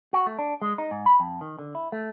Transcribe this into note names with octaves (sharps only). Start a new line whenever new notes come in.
F#4
A3
D4
G#3
D#4
G#2
B5
F2
D#3
D3
E4
A3